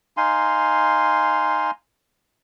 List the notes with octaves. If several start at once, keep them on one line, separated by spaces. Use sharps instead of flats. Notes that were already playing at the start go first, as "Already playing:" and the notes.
D#4 F5 G#5 C6